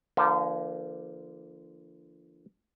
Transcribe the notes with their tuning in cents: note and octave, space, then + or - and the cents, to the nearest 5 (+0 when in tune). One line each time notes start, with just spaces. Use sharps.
D3 +0 F3 -35 A#3 +15